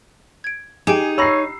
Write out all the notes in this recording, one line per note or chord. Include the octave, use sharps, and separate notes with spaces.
G#6 D7
D#4 G4 G#4 G5
C#5 A#5 B5 E6 A#6 C7